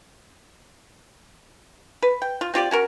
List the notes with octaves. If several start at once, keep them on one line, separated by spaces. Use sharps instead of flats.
B4
G5
F4
C4 F4 G4 D5
C#4 F#4 A#4